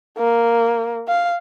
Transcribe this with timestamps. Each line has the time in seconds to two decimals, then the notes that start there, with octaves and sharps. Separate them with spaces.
0.18 A#3
1.08 F5